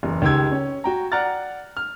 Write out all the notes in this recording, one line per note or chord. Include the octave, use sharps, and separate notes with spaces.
F#1 E2
C#2 D#3 G4 G5 E6 G#6
C#4
F#4 G5 A#5
D5 F#5 A#5 F6 F#6 A6
F6